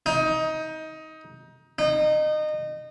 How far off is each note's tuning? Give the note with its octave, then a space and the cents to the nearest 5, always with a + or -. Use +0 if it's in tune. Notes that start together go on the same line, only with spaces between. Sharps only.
D#4 +20
D#4 -25